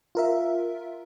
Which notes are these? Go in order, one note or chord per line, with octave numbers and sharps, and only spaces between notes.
F4 A#4 E5